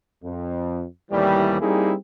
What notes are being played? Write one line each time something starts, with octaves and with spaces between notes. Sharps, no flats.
F2
D#2 A2 C3 E3 G3
G3 A#3 C4 D#4 E4 G#4